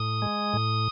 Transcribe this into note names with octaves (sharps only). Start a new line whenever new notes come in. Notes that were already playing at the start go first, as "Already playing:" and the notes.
Already playing: A2 D#6
G#3
A2